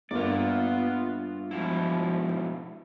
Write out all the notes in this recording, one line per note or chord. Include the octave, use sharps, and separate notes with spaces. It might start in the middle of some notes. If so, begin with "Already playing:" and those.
G1 A#3 B3 F4 D5
G#2 B2 F3 E4